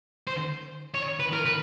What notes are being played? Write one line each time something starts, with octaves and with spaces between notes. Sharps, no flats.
C5
C#5
B4
A#4
B4